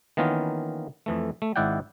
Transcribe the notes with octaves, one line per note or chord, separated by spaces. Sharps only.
D#3 E3 A#3 B3 C#4 F4
F2 E3 A3
A3
G#1 G#2 E4 D5 F#5 G5